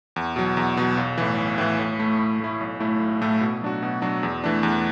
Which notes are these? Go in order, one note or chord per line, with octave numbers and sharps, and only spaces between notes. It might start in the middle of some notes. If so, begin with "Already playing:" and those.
E2
B2 F#3
E2
B2 F#3
B1
A2 E3
B1
A2 E3
A2
A3 E4
A2
A3 E4
B1
A2 A3 E4
B1
A2 A3 E4
B2
F#3 D4 F#4
B2
F#3 D4 F#4
E2
E3 A3 D4
E2